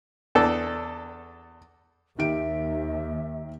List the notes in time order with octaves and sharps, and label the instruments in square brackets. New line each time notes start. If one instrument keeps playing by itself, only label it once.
[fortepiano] E2 D4 A4
[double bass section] D#2 [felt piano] D#3 G4 D7 [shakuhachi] E5